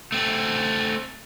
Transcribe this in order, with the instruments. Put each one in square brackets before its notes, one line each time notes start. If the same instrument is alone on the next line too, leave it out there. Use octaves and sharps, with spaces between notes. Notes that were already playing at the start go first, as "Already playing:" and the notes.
[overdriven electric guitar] A3 C4